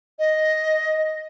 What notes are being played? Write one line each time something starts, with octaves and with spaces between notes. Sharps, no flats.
D#5